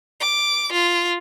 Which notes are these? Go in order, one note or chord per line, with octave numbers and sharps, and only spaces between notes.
D6
F4